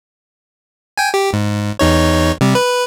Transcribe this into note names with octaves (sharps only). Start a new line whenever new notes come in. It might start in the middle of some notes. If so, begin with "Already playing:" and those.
G5 G#5
G4
G#2
E2 D#4 C#5
C3 G3
B4